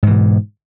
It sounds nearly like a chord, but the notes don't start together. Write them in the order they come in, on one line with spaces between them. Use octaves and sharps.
G#2 E3 B2